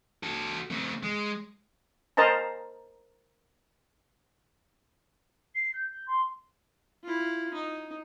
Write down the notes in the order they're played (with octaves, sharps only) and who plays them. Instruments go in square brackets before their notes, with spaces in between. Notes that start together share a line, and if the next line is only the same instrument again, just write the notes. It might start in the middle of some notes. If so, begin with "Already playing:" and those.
[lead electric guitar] F#4 A4
A3 C4
G#3
[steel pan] A#4 C5 D#5 A5 A#5
[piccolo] C7
G6
G6
C6
[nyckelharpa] E4 F4
D#4